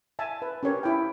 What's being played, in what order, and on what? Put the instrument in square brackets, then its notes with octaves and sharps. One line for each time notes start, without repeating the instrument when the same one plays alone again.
[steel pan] E5 G#5 A5
B4
C#4 G4 A#4 C#5
E4 G5